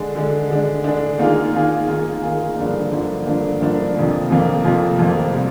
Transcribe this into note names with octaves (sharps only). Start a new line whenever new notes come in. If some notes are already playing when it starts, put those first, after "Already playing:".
Already playing: D3 G#3 D4
D3 G#3 D4
D3 G#3 D4
D3 G#3 D4
D#3 A#3 F4 G#4
D#3 A#3 F4 G#4
D#3 A#3 F4 G#4
D#3 A#3 F4 G#4
G2 D3 F3 A#3 D4
G2 D3 F3 A#3 D4
G2 D3 F3 A#3 D4
G2 D3 F3 A#3 D4
F2 C3 F3 A#3
F2 C3 F3 A#3
F2 C3 F3 A#3
F2 C3 F3 A#3
C3 G3